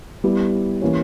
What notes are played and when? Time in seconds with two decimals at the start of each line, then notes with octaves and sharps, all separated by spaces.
0.24 G3 B3 E4 G4
0.82 E3 A#3 C#4 G4 C#5